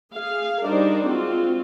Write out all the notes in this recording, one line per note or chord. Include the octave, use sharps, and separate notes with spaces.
G#4 F5
G3 D4 D#4 A#4 C5 D5
G#3 C4 F4 F#4